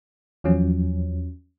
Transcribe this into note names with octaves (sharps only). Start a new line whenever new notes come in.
E2 F3 F#3 C#4